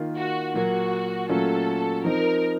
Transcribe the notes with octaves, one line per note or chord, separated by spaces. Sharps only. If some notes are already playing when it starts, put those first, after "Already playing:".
Already playing: D#3 A#3 F4
F#4
A#2 F#3 A#3 F#4
A#2 F#3 A3 C#4 F4 A4
F3 C4 D#4 A#4